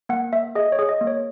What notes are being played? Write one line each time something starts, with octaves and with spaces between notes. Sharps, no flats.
A#3 F#5
A#3 E5
G#4 D#5
C#5
G#4
D#5
A#3
C#5